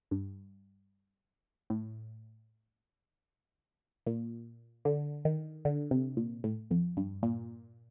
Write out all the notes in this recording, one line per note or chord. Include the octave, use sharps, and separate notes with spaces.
G2
A2
A#2
D3
D#3
D3
C3
A#2
A2
F2
G2
A#2